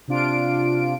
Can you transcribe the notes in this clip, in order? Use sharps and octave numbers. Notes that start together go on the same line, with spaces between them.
C3 D4 F4 D7